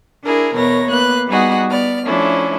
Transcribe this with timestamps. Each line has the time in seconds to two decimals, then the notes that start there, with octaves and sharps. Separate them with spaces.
0.24 D4 E4 G#4 A#4
0.54 E2 B2 A#4 B4 C#5 A#6
0.89 A#3 B3 B4 F#6
1.28 G3 B3 D#4 F#4 G#4 F#5
1.70 B3 D5 F6
2.04 F3 A3 C#4 D4 E4